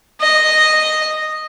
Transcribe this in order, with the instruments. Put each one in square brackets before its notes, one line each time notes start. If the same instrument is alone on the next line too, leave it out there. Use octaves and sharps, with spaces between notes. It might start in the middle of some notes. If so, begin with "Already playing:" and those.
[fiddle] D#5